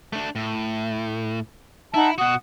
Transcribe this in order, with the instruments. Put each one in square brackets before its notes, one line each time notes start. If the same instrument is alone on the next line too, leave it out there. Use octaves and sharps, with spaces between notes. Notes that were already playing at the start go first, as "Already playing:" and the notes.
[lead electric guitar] A3 D4
A2
[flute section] D#4 F#5 A5 [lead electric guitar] E4
[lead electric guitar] B2 F#4 [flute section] F#5 D#6